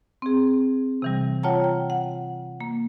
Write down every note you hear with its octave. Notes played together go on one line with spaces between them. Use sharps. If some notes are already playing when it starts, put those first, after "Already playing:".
C4 G#4
C3 E3 G3
F4 C#5 F#5 G5 A5 A#5
G5
F#5
A#3